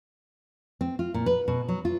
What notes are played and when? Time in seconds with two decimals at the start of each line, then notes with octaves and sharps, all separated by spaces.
0.81 C4
0.99 F4
1.14 A#2
1.26 B4
1.48 B2
1.68 F#3
1.85 F4